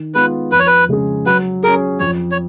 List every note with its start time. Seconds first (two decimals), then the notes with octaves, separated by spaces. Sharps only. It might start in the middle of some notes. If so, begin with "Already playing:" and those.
Already playing: D#3
0.15 G#3 B3 F4 B4
0.52 F2 B4
0.59 C#5
0.67 B4
0.89 C#3 G#3 C#4 G#4
1.26 F#3 B4
1.63 C#4 G#4 A#4
2.00 F2 C#5
2.32 C#5